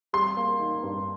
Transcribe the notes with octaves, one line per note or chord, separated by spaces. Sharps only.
G3 C6
A#3
D#4
G2